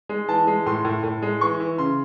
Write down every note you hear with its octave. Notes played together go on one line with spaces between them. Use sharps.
G#3
E3 A5
G#3
A2 C6
A2
A2
G#3
E3 C#6
E3
C#3 C6